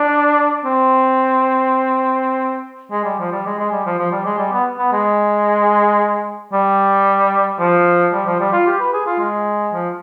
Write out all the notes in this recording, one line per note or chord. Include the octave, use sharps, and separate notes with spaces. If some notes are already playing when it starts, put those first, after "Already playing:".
Already playing: D4
C4
G#3
G3
F3
G3
G#3
G#3
G3
F3
F3
G3
G#3
G3
B3
B3
G#3
G3
F3
G3
F3
G3
F4
G4
B4
G#4
F4
G#3
F3